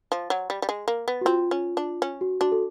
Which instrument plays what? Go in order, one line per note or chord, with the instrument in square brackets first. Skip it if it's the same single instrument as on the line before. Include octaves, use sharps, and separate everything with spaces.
[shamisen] F3
F#3
G3
G3
G#3
A#3
B3
[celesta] F#4
[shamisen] C4 [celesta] F4
[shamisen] C#4
D4
C#4
[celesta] F#4
[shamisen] D4 [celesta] F#4
[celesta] A4